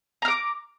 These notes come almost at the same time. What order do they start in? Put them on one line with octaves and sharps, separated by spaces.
A#5 F6 D6